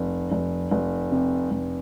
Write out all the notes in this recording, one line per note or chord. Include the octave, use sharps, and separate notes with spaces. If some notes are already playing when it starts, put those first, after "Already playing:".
Already playing: F1
F1
F1
C3
F1